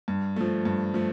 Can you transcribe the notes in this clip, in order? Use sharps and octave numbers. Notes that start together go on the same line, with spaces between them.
G2
F3 A3
G2
F3 A3